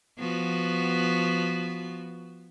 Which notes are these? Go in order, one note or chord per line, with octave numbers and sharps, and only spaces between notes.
F3 B3 F#4